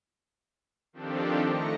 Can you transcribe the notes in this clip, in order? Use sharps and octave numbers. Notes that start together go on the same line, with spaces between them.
D#3 F3 C4 D4 G4 A4
A3 D#4 A#6 C#7